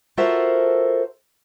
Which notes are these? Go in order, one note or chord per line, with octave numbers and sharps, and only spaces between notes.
F4 F#4 A4 A#4 C5 E5